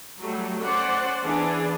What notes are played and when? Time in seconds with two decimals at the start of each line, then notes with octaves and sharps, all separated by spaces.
0.20 F#3 G3 A3
0.62 C#4 C5 D5 F#5
1.22 E3 B3 D4 G#4 D5